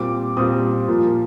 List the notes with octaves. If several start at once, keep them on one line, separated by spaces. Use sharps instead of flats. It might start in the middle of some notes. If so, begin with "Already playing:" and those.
Already playing: A#2 G3 C4 D6
A#2 G3 C4 D#6
A#2 F3 A#3